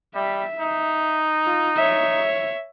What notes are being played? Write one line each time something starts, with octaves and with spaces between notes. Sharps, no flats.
G3 E5
D#4
F4
C#5 E5